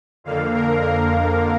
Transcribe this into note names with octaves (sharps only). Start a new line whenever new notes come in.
F2 D3 A#3 F5
A#4
A#4